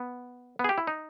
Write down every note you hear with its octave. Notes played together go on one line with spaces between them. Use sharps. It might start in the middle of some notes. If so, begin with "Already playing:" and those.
Already playing: B3
B3
G#4
G4
E4
D#4